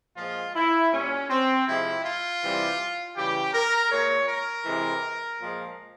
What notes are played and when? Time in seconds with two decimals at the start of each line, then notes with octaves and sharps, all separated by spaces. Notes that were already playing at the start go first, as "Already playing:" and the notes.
0.16 A#2 F3 G#3 F4
0.54 E4
0.92 A#2 G3 C#4
1.29 C4
1.66 C3 F3 G#3 E4
2.04 F4
2.41 C3 E3 G3
3.15 C#3 E3 G3 G4
3.53 A#4
3.90 A#2 G#3 C#5
4.28 A#4
4.65 C3 E3 G#3
5.40 A#2 F3 G#3